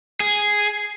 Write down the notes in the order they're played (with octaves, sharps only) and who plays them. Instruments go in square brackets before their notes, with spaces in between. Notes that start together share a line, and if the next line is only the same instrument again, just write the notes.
[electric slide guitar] G#4